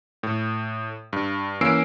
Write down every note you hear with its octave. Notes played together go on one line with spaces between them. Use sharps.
A2
G2
E3 A#3 C#4 E6 C7 D7